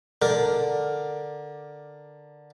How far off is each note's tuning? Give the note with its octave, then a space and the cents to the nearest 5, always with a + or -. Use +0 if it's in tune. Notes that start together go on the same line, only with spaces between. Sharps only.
D3 +5 A#4 +5 D5 +0